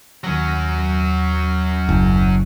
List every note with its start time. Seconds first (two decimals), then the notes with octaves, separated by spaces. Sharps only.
0.24 D#2 F#3 C#4 A#6
1.89 F#1